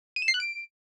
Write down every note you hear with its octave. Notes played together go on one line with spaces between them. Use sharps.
D#7
E7
C7
F#6
D7